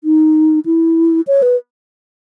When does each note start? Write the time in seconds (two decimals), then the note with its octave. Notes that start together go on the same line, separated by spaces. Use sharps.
0.04 D#4
0.66 E4
1.27 C#5
1.42 B4